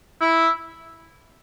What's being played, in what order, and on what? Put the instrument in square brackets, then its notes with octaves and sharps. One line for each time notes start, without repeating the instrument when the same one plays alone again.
[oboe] E4